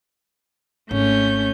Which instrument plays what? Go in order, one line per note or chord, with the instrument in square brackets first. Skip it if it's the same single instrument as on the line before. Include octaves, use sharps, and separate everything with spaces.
[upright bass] G#1 [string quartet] A3 C#4 G6